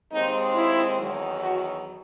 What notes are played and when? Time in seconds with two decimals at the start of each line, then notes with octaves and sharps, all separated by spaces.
0.12 D#2 D#3 G#3 C4 D#4
0.55 E4
0.99 E2 D#3 F#3
1.42 F#4